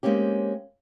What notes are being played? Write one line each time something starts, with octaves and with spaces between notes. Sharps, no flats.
G#3 A#3 C4 C#4 G4